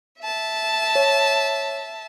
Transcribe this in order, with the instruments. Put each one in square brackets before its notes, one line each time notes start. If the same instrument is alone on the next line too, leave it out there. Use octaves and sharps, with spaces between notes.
[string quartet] E5 A5
[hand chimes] C#5